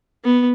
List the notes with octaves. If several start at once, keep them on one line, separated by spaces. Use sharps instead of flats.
B3